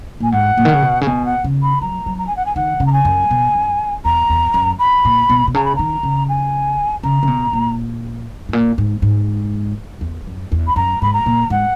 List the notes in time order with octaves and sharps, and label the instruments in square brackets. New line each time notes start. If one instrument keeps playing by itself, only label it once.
[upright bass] A#2 [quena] G#5
[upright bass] G#2 [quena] F#5
[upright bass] A#2
D#3
C#3
B2
C#3
[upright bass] B2 [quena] G#5
[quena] F#5
[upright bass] C#3
[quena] B5
[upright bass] F#3 [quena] A#5
[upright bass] F#3
[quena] A#5
G#5
F#5
G#5
[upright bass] D#3 [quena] F#5
[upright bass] C#3
[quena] A#5
G#5
[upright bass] F#2
B2
F#2
[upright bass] E2 [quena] A#5
[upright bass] E2
F#2
[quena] B5
[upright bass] A#2
B2
B2
[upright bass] C#3 [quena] A#5
[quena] B5
[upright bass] D#3 [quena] A#5
[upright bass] C#3
[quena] G#5
[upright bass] C#3 [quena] A#5
[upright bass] C#3
B2
A#2
G#2
A#2
G#2
G#2
E2
F#2
E2
[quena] B5
[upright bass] F#2 [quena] A#5
[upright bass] G#2 [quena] B5
[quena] A#5
[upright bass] A#2
[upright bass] G#2 [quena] F#5